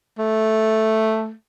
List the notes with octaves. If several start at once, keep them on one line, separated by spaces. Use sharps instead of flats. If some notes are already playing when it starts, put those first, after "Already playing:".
A3